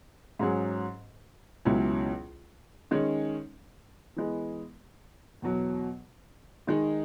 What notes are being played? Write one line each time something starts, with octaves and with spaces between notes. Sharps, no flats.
G#2 F#3 C#4 G#4
C#2 B2 F#3 C#4 E4
D#3 G#3 C#4
E3 G#3 B3
E2 B2 F#3
D#3 G#3 D#4